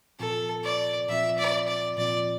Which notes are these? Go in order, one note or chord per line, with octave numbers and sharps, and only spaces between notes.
A#2 F3 C4 F4 A4
D5
A#2 F3 C4 F4 E5
D5
D5
A#2 F3 C4 F4 D5